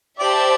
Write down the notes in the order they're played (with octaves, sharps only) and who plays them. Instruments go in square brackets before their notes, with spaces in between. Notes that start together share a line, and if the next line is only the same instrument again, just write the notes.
[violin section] G4 C5 E5 A5 [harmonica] D5